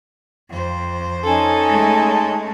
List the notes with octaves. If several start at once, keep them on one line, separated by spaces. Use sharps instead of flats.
F2 C5
C#4 D#4 A4 G#5 A5
G#3 A3